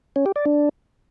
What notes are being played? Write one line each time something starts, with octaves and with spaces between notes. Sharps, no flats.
C#4
G4
D5
D4